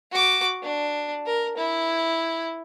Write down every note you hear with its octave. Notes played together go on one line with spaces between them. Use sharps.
F#4 D6
D4
A#4
E4